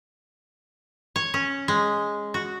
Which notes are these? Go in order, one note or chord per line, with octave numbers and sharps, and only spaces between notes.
C#5
C#4
G#3
F#4